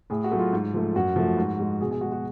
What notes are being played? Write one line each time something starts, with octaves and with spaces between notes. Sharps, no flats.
A2 G#4
F#4
F#3 A3
F4
G#2
F3 A3
F#2 F#4
F3 A3
G#2
G#3
B2 G#4
G#4
G#3 F#4
F#4